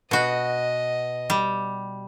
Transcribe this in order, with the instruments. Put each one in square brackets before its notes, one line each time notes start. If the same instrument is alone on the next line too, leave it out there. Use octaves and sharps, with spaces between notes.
[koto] B2 F#4 [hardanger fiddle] D#5
[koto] G3